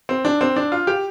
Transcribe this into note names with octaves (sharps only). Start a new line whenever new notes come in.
C4
D4
C4
D4
F4
G4